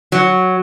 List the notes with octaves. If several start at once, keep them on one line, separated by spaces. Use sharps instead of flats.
F#3